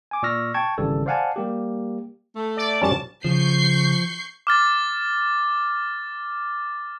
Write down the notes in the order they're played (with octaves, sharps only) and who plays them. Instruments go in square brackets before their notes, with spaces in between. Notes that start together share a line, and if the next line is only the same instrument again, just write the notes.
[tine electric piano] G#5 D6
A#2 D5 C#6 E6 F6 A#6
G5 A5 C#6 G#6
G#1 C#3 E3 G3 A4
C5 D5 F5 F#5 G#5 A5
G3 A#3 G4
[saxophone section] A3
[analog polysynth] D5
[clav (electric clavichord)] F#2 G3 C#4 [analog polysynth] A5
[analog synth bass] C#3 [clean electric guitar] F3 [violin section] C#6 G6 C7
[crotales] D6 F6 A6